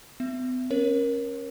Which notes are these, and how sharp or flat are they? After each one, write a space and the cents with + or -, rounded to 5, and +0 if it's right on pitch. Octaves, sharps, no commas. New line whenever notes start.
B3 +45 E5 +20
C#4 -20 A#4 +15 C#5 -30